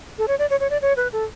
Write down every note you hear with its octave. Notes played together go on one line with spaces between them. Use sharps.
A4
C#5
D5
C#5
C#5
D5
C#5
B4
A4